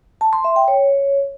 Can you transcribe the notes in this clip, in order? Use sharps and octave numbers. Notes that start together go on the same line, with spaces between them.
A5
C6
E5
G5
C#5